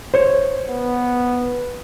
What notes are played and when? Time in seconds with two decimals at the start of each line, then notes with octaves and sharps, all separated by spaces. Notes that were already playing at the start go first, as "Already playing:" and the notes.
0.14 C5 C#5
0.68 B3